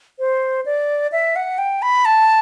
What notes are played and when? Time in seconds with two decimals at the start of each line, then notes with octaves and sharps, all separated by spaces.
0.19 C5
0.66 D5
1.12 E5
1.36 F#5
1.58 G5
1.82 B5
2.05 A5